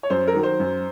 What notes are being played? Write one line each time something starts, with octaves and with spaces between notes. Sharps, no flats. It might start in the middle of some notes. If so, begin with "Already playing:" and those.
C#5
F#2 C5
A#4
D#3 F#3
C5
F#2